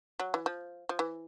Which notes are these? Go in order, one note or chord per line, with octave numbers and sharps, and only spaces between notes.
F#3
E3
F3
F3
E3